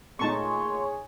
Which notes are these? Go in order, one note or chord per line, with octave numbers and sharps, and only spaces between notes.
A#2 A3 D#4 G#4 C#5 A5 C6 C#6